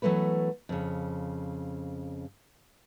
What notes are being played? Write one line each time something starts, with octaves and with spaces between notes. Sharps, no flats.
E3 F#3 A3 B3 B4
F2 C#3